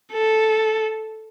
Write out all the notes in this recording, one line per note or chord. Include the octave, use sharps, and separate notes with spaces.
A4